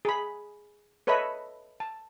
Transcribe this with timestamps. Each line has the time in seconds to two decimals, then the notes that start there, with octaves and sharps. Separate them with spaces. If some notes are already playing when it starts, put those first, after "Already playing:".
0.05 G#4 B5
1.07 A4 B4 C#5 D#5 E5 B5
1.80 A5